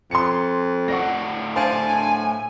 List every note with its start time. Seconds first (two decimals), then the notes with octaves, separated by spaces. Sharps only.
0.11 F2 C6 C#7
0.88 A2 D5 F#5 C#6 A#6
1.56 D4 C5 F5 G#5